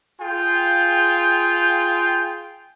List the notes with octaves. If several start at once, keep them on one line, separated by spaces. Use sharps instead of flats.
F4 G#4 G5